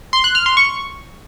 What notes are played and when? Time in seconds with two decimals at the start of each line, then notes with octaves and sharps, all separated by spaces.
0.13 C6
0.24 F#6
0.35 F6
0.46 C6
0.57 C#6